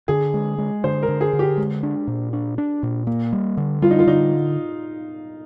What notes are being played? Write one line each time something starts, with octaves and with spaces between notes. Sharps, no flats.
D3 G#4
G#3
G#3
D3 C5
A#4
D3
G#4
D3
G4
G#3
D4
A#2
D4
D4
A#2
A#3
G3
D3
G3 F4
D#4
F4
D3 D#4